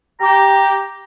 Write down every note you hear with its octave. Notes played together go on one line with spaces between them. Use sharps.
G4 A#5